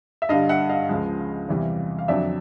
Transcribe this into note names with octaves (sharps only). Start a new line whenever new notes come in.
E5
G2 D3 G3 D#5 F5
E5 F#5
D#5 F5
C#2 C#3 F3 G#3
E2 C3 E3 G3
F5
F2 D3 F#3 D5 E5